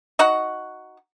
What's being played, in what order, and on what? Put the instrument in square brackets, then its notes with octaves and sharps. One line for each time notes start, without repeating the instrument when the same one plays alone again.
[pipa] D#4 F#4 F#5